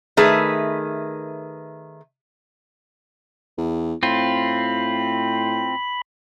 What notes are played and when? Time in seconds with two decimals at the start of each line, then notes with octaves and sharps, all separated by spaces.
0.17 D#3 A3 G#4 B4 E5
3.58 E2
4.03 A2 C4 F4 B5